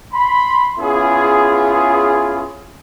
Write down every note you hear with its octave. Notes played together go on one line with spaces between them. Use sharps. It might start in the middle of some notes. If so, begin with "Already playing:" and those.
B5 C6
B3 C#4 E4 F4 G#4